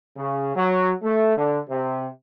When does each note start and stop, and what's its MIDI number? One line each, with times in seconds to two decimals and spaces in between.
0.17 0.55 49
0.55 0.92 54
1.02 1.35 57
1.37 1.58 50
1.69 2.06 48